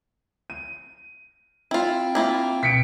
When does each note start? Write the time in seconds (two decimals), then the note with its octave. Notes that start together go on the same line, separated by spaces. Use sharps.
0.50 D#7
1.71 C4 E4 F4 G5
2.15 A#3 E4 F4
2.63 B2 B6 C#7 D7